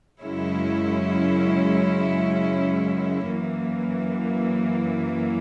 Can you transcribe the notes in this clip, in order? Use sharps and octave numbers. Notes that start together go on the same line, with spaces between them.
F#2 C#3 G#3 C#4 E4
F#2 E3 A#3